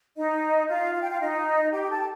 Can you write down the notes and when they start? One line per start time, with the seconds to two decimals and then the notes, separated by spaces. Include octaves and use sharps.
0.16 D#4 D#5
0.68 F4 F5
0.94 F5
1.02 G5
1.09 F4 F5
1.20 D#4 D#5
1.72 G4 G5
1.82 G5
1.90 A4 A5